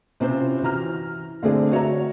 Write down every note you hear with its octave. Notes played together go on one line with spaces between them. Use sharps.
C3 C4 C#4 E4 F4 C5
E3 F#4 A#5 F6
D3 A3 C4 D4 G#4 D5
F#4 C#5 E5 A#5